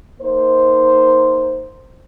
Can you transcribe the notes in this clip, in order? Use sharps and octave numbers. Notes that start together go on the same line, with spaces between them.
A#3 D#4 C5